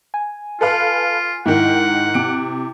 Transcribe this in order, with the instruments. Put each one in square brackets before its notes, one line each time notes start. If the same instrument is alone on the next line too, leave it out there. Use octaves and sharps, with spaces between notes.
[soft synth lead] G#5
[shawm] F4 [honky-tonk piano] A4 B4 F5
[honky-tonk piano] G#2 D#3 [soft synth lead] E4 [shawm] F#5
[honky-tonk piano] C3 D7